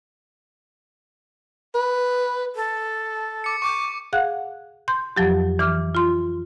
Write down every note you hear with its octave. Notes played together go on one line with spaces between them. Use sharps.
B4
A4
D6 C#7
C#6 D6
G#4 F5 F#5 F#6
C6 G6
F2 F3 F#3 G4
E3 D6 F6
F4 C6